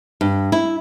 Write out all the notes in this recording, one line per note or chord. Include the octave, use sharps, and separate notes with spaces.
G2
E4